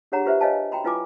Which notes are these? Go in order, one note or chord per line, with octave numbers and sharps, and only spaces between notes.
D4 G4 G#4 C#5 F#5 A#5
F4 G4 B4 C5 E5
B4 C#5 D#5 F5 G#5 A5
F#4 G5 A#5 B5
E4 F4 B4 G#5 D6